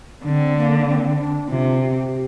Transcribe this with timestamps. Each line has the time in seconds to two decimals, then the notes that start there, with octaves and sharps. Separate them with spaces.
0.25 D3 C4 D4
0.57 A#3
0.88 C4
1.20 D4
1.50 C3 F4
1.82 G4